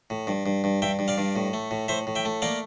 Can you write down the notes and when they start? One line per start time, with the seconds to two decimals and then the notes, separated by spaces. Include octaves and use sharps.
0.10 A2
0.27 G2
0.46 G2
0.64 G2
0.82 G2 E5 G5
0.99 G2
1.08 D5 F5
1.18 G2
1.36 A2
1.53 A3
1.71 A2
1.88 A2 C5 E5
2.07 A2
2.15 E5 G5
2.25 A3
2.42 A#3 D5 F5